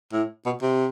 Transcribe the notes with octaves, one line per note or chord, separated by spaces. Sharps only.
A2
B2
C3